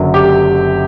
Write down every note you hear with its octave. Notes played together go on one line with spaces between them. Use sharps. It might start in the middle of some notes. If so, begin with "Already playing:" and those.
Already playing: F#1 F#2 D3 F#3
G4